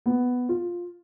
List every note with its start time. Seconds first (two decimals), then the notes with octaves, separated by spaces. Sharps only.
0.06 B3
0.49 F4